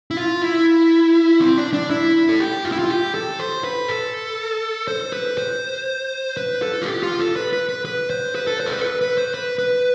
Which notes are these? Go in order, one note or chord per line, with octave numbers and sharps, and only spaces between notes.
E4
F4
E4
C4
D4
D4
E4
A4
G4
F4
E4
F4
G4
A4
C5
B4
A4
C5
B4
C5
B4
A4
F4
G4
F4
A4
B4
B4
B4
B4
C5
B4
A4
C5
A4
B4
A4
B4
B4
C5
B4
B4